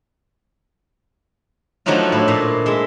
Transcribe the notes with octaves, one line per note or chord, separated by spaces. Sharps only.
F3 F#3 A3 D4 D#4 F4
A2 E4
A#2
G#3 E5